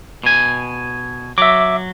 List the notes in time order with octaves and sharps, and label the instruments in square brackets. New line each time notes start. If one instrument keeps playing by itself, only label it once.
[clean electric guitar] B2 G#5
[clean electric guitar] F#3 [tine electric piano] E5 D6